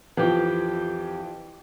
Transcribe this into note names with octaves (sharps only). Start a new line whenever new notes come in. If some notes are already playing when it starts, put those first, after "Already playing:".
F2 E3 F3 G4